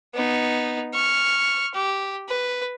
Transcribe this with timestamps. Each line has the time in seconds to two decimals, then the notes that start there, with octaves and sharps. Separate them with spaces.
0.14 B3 D#4
0.94 C#6 F6
1.75 G4
2.29 B4